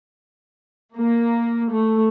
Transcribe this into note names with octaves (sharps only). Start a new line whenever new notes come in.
A#3
A3